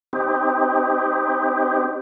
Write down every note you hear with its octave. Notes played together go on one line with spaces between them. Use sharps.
C4 D#4 G4